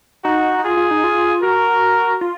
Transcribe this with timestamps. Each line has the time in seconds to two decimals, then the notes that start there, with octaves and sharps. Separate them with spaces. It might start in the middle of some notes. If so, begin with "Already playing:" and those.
0.24 D#4 F#4
0.59 D#4
0.64 F4 G#4
0.77 F4
0.91 D#4
1.04 F4
1.43 F#4 A#4
2.21 F4